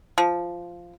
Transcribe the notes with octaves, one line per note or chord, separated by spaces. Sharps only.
F3